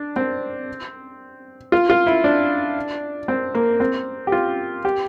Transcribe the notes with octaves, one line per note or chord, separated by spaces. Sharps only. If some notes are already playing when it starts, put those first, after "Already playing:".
Already playing: D4
C4
F4
F4
E4
D4
C4
A#3
C4
G4
F4
G4